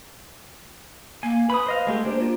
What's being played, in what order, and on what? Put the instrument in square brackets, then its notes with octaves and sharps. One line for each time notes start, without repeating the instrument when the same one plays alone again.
[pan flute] A#3 [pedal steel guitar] G#5
[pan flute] B4 [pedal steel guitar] B5 D#6
[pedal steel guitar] C5 D#5 F5
G#3 A3 G4
[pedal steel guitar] A#3 D4 G4 [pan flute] C5
[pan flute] F4